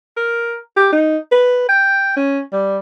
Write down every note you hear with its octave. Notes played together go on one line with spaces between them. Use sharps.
A#4
G4
D#4
B4
G5
C#4
G3